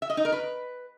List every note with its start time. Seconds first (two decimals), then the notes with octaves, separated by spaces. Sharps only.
0.02 E5
0.10 D#5
0.17 D#4
0.25 A#4
0.32 B4